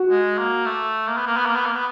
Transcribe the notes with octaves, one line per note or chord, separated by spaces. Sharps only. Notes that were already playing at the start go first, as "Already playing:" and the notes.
Already playing: F#4
G#3
A#3
A3
A#3
B3
A#3
B3
A#3
B3
A#3
B3